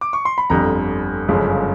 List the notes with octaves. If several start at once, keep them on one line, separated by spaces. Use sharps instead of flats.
D6
C#6
C6
B5
G1 F2 D3 G3 A#5
G1 F#2 C#3 F3 G#3